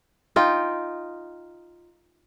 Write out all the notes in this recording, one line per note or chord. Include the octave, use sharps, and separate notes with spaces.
D#4 F4 G5